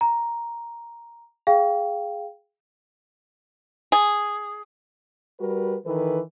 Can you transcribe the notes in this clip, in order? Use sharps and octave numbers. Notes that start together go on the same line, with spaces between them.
A#5
G#4 F5 G5
G#4
G3 F#4 A#4 B4
D#3 E3 A4 B4